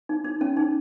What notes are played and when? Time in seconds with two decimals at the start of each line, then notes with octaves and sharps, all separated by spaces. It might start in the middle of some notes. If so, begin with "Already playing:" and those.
0.09 D#4
0.25 D#4
0.41 C#4
0.57 D#4